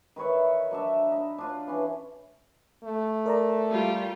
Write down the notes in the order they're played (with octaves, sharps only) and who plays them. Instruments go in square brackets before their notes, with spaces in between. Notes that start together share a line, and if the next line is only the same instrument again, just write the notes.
[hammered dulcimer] D#3 B4 C#5 E5
F#3 D4 E5
D#4
D4 F4
E3 C#4
[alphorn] A3
[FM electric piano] A#4 D5 A#5
[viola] G3 F4